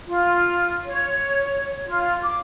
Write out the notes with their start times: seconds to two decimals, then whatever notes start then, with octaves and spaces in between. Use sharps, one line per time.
0.07 F4
0.86 C#5
1.86 F4
2.22 D6